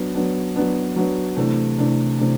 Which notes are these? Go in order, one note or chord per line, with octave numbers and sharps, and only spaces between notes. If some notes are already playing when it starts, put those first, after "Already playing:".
Already playing: F#3 B3 D4
F#3 B3 D4
F#3 B3 D4
F#3 B3 D4
C3 E3 A3 D4
C3 E3 A3 D4
C3 E3 A3 D4